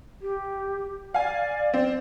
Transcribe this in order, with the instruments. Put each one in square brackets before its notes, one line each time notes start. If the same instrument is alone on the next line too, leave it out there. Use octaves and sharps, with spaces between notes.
[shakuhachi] G4
[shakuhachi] D5 [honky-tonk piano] F5 G#5
[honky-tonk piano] C4